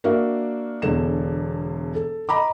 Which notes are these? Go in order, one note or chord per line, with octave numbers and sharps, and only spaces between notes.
A#3 D4 F#4 A#4 E5 F5
E1 E2 D3 E7
A4
D#5 A#5 B5 D6